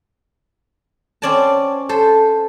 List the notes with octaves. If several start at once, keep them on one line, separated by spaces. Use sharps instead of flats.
C4 C#4 D5 G#5 A5
A4 C5